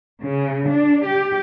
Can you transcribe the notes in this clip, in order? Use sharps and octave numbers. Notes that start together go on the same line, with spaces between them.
C#3
D4
G4